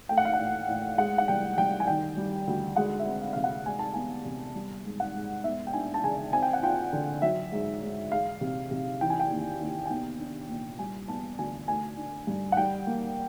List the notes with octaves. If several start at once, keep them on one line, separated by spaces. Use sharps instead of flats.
A3 G5
F#5
F5
F#5
A2
A2
G#3 F#5
F#5
C2 G5
C2 G5
G#5
D#3 G5
G3
D2
G#3 F#5
E5
C4
F5
C3 F5
F#5
G#3 G#5
A5
B3 G#5
C3
G3
G#2
F#5
G#2
B3 E5
G5
D4 G#5
A5
C#3 G#5
C4 G#5
G5
F#5
F4 G5
D3
F#3 E5
G#2
G#2
G#3 F5
C3
C3
E3 G5
G#5
G5
D#2
D#2
G#5
B3 G5
D4
A#2
G3 G#5
B3 A5
D2 G#5
A3 G#5
D4
G2
F#5
G3 G5
A#3